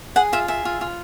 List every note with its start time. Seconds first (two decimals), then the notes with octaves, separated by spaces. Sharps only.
0.16 G#4 F#5
0.33 F4 E5
0.48 G#4 E5
0.65 F4
0.81 F4